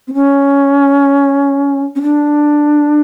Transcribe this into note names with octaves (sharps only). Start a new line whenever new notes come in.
C4
C#4
C#4
D4